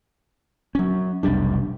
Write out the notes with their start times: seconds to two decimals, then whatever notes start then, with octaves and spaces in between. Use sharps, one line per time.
0.75 F#3 C#4
1.23 F1 B1 G3 D4